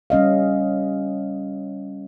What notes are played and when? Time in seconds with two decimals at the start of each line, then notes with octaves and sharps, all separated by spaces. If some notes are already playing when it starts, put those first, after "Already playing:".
0.10 G3 C#4 D#5 F5